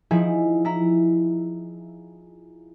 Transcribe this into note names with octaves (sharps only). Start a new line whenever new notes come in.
F3 D#4 E4 G#4
E4 A#5